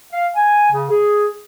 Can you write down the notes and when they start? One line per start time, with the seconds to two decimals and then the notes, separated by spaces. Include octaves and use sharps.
0.13 F5
0.35 G#5
0.71 C#3
0.90 G#4